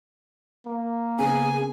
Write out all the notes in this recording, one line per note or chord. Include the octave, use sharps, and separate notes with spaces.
A#3
C#3 B3 C4 G#4 G#5